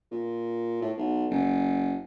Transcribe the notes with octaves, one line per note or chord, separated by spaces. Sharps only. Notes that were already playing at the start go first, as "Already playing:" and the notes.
A#2
A2
B1
F#1